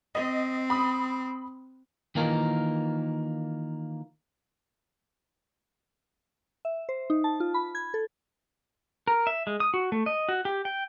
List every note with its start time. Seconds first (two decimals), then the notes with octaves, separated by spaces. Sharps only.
0.15 C4 D#5
0.70 B5 D#6
2.15 D#3 E3 A#3 D#4 F4 A#4
6.65 E5
6.89 C5
7.10 D#4
7.24 A5
7.40 F4
7.54 B5
7.75 G#6
7.94 A4
9.08 A#4
9.27 E5
9.47 G#3
9.60 D#6
9.74 F#4
9.92 A3
10.06 D#5
10.29 F#4
10.45 G4
10.65 G5